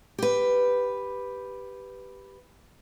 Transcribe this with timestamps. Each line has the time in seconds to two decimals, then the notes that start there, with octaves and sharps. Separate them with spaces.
0.18 G4 B4